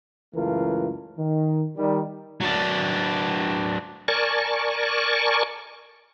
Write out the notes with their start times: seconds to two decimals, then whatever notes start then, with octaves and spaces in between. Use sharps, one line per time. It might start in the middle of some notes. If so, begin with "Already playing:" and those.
0.35 C#2 F#2 E3 A3 F4 A#4
1.18 D#3
1.77 D#3 G3
2.41 F#3 D4
4.08 A#4 D5 G#5 A5 C#6